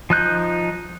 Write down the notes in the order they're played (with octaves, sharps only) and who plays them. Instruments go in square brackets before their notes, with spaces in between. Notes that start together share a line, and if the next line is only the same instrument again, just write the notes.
[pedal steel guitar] F3 D#4 F#6 G6